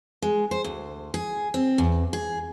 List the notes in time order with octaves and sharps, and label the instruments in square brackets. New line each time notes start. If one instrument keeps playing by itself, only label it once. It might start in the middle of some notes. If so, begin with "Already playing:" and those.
[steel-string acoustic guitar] G#3
C5
D2
G#4
C4
E2
G#4